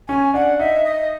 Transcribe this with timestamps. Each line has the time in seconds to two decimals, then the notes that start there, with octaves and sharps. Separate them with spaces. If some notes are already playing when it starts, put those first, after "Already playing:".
0.08 C#4 G#5
0.34 D4 F#5
0.59 D#4 E5
0.85 D#5